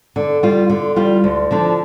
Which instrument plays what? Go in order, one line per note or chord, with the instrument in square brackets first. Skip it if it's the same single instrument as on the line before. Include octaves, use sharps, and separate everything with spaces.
[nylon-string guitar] D3
G3 F4
D3
G3 F4
D2
D3 F3 D4